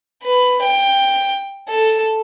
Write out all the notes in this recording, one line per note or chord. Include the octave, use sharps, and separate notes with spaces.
B4
G5
A4